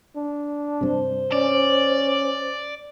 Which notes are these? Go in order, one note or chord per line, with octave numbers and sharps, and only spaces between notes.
D4
G2 C3 C5
C#4 D5